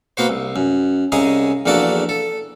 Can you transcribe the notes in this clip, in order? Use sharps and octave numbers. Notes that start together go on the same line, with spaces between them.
A#3 B3 F#4 C5
C2
F#2
C2 C#3 G#4 D#5 G#5 A#5
A#1 E2 D3 A#3 F#4 D5
A4